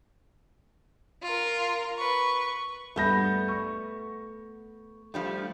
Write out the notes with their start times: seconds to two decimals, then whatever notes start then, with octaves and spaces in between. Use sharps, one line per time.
1.22 F4 A#4
1.97 B4 C#6
2.96 G2 A3 B3 G6 A#6
3.48 C#6
5.14 F3 G3 A3